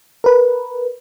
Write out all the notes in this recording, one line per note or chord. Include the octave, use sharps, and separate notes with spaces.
A#4 B4